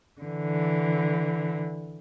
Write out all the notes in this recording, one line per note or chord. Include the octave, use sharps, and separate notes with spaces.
D3 E3